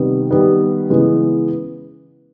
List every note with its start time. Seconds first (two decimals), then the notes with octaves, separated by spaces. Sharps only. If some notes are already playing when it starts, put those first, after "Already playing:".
Already playing: C3 D#3 G3 B3
0.31 D#3 G3 B3
0.90 C#3 E3 G#3 B3